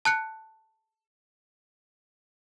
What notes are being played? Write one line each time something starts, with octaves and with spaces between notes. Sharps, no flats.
A5 F#6 C#7